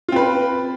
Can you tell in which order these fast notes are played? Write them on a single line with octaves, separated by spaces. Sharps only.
F4 C4 B4